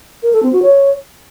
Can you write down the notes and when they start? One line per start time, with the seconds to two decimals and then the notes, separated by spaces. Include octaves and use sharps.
0.23 A#4
0.33 A4
0.43 C4
0.53 F#4
0.63 C#5